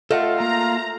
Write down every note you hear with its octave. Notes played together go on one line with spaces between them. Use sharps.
A3 F4 A4 D#5 F#5
A#3 A#5